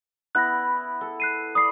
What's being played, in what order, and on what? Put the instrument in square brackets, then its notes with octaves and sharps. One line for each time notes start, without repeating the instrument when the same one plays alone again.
[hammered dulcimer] B3 E4 B5 [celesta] F#6 A#6
[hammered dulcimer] A4
[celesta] F#6 C7 D#7
[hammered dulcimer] B4 D5 [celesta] D#6 C7